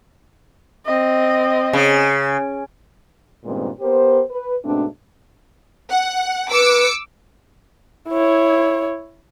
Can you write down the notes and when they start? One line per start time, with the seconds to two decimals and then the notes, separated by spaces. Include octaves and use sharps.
0.86 C4 D#5
1.73 C#3
3.45 G2 A#2 D#3 G#3 B3 C4
3.80 B3 G4 A#4 C5
4.30 B4
4.65 G#2 B2 A3 C4 D4
5.90 F#5
6.51 B4 D6 E6 C#7
8.09 E4 C#5